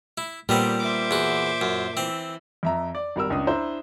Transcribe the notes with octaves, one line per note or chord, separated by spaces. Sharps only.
E4
A#2 G3 B3 C4 G4
C5 E5 D6
E2 F#4
F#2
E3 C4
F2 E5 A#5
D5
G#1 G3 A#4 E6
C#2 C#4 D4 D#6
D4 E4 C5 A#5